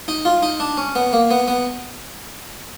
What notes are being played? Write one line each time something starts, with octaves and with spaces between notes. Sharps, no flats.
D#4
F4
D#4
D4
C#4
B3
A#3
B3
B3